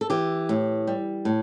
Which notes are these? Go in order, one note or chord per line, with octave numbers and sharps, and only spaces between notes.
A4
E3 G4
A2
G3
A2